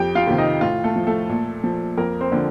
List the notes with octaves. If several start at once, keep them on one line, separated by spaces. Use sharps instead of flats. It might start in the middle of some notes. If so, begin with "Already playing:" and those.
Already playing: F2 G4 G5
F4 F5
C3 D#3
D#4 D#5
A2 F4
A3 A4
F3
A3 A4
A#2
F3
F2 A#3 A#4
C4 C5
D3 F3